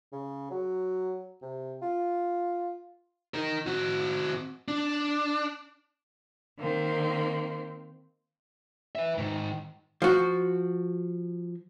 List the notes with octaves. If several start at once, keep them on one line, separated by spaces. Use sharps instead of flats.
C#3
F#3
C3
F4
D#4 A#4
C4 F#4
D4
D#3 A#3 C4
B4 E5
G#2 D#3
F3 F#4